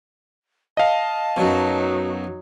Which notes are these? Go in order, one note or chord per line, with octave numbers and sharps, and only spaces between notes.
D#5 F5 A5
F#2 B2 F#3 D#4